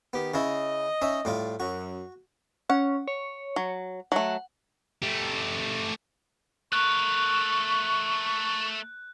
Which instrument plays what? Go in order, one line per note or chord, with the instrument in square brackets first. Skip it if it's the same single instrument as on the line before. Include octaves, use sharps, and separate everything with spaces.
[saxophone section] D#3 G4 [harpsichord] B3
[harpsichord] C#3 C#4 E4 [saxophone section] D#5
[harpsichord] C#4 D#4 E5
A2 G3 F4
[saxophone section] F#2 [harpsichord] F#4
[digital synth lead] C#4 [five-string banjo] F#5
[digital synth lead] C#5
[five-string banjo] F#3
[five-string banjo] F#3 A3 [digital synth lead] F#5
[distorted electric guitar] A3 G4
[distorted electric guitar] A3 A#4 [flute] C#6 [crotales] F#6